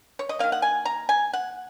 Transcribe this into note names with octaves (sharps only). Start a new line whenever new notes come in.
C#5
D#5
D#3 A#3 F5
F#5
G#5
A#5
G#5
F#5